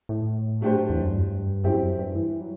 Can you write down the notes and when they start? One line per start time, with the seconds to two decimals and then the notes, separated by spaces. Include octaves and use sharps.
0.09 A2
0.61 F#3 A3 D4 G4 C5
0.89 E2
1.01 F#2
1.13 G2
1.64 F#2 F#3 C4 E4 G4
1.99 G2
2.16 E3
2.41 F#3